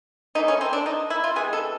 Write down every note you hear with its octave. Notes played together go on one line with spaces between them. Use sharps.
E3 A3 D#4
C#4
C4
D4
D#4
E4
F4
C3 E3 G#3 B3 G#4
A4